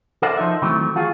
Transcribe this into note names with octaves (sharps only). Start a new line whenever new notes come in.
A4 A#4 C5 D5 E5 F#5
F3 D#4 E5
D#3 E3 F#3 A3 C4
F4 F#4 G#4